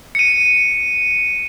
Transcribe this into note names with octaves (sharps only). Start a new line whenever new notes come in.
C#7 D#7